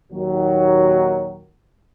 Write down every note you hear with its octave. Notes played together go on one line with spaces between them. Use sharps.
D#2 A#2 D#3 F#3